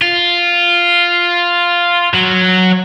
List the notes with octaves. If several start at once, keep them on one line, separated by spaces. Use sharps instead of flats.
F4
F#3